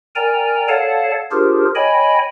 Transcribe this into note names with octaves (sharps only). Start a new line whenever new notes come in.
A#4 D5 G5 G#5 A#5
A4 C#5 D5 F5 F#5 A5
D4 F4 G4 G#4 A#4 C5
C#5 D#5 G5 G#5 B5